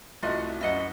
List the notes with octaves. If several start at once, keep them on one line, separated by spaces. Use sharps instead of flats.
C2 A3 F4 F#4 D#5
F#2 E4 D#5 E5 F#5